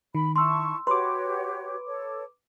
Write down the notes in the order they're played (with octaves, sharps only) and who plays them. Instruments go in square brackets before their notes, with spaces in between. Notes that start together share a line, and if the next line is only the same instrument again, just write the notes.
[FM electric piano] D#3 [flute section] B5
[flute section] E4 A5 C#6 [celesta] C6 E6
[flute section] F#4 G4 C#5 [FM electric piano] B4 D6 [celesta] C6
[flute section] A4 C#5